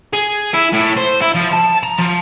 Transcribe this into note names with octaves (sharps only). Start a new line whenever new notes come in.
G#4
E4
A2
C5
E4
F3
A5
A#5
F3